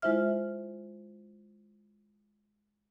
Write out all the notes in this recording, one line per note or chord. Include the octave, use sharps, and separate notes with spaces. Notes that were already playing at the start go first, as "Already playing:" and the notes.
G#3 E4 F4 C5 E5 F6